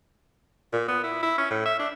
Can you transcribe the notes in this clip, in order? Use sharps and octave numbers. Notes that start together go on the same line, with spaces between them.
A#2
B3
E4
E4
C#4
A2
E5
D4